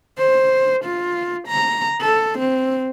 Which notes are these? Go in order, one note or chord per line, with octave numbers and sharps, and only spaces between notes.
C5
F4
A#5
A4
C4